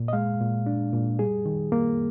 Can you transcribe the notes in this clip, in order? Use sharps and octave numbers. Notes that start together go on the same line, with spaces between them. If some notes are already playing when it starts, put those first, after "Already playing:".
Already playing: A#2
D#5
G#3 F5
A#2
D4
A#2
G3 G#4
D#3
A#3